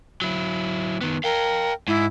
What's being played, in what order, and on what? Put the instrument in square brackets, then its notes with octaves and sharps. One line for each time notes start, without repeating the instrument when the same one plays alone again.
[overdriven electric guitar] F#3 E4
D#3 B3
[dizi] A#4 [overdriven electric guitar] F5 G5
[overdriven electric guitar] G#2 [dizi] E4